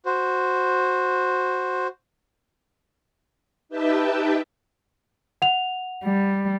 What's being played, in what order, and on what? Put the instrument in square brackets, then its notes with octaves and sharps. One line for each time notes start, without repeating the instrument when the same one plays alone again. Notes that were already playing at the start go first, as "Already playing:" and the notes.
[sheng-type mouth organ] F#4 C5
[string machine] D#4 G4 B4 E5 G5 A5
[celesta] F#5 F7
[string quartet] G3